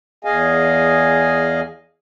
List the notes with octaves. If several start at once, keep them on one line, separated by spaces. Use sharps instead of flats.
E2 G#4 D#5 F5 G#5